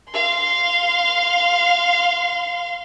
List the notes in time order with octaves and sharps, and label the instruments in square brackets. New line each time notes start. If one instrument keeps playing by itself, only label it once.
[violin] F5 C6